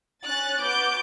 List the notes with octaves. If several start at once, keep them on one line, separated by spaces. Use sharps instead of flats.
C#4 F#6 A6
B3 F#4 D6 G6 D7